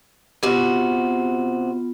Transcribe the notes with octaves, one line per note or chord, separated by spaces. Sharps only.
C3 B3 F4 F#4